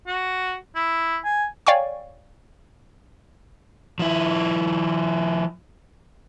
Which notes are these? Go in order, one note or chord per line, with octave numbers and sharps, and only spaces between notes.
F#4
E4
G#5
C#5 D5 F5 G5 G#5 C#6
F3 E4